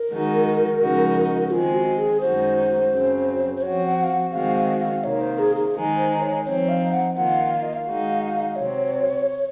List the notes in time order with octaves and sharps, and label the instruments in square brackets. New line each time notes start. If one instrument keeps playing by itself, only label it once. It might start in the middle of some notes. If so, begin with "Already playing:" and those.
Already playing: [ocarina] A#4
[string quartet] D#3 G#3 D#4 F#4
F2 C#3 G#3 D#4 F#4
[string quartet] D#3 G#3 C4 [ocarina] F4
[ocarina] F#4
G#4
[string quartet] F#2 D#3 G#3 D#4 F#4 [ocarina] C5
[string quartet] F#2 C#3 F#3 C4
[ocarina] C5
[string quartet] F3 C4 F#4 [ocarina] C#5
[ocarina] F#5
F5
F#5
[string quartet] D#3 G#3 C4 F#4 [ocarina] F5
[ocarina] F5
F5
[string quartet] C3 D#3 A#3 [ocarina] C#5
[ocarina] C5
G#4
G#4
[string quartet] D#3 G#3 D#4
[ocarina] C5
C#5
[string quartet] F3 C4 D#4 [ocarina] C#5
[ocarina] F5
F#5
[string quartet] D#3 A#3 F4 [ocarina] F#5
[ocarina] F5
D#5
F5
[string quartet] D#3 G#3 D#4 F#4
[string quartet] C3 F#3 C4 [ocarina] C#5